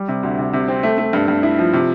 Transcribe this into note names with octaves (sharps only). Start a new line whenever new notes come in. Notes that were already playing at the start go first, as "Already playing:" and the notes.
Already playing: G3
C3
D2
C3
C3
C4
A3
A3
G2
G2
E4
F3
C3